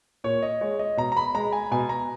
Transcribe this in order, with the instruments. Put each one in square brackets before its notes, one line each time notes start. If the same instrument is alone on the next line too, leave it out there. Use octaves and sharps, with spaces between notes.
[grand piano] A#2 C#5
D#5
G#3 C#5
D#5
B2 A#5
A#5
B5
G#3 A#5
G#5
B2 G#5
A#5